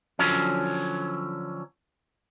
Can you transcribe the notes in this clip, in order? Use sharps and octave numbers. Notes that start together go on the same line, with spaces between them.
D3 F3 F#3 C#4